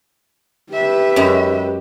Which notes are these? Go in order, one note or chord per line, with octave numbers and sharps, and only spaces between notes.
G4 B4 E5
F#2 G#3 A#5